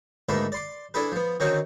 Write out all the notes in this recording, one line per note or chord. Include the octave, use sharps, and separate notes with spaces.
D2 G#2 A#3 A4 B4 E5
D5 C6 D6
D4 E4 G#4 A4 B4
F3 B3
D3 D#3 C4 C#4 D#4 F#4